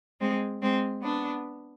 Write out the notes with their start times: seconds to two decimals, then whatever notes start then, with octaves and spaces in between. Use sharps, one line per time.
0.20 G#3 C4
0.61 G#3 C4
1.03 B3 D4